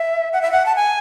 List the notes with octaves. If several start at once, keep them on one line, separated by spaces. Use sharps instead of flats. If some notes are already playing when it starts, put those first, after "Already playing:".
Already playing: E5
F#5
E5
F#5
A5
G#5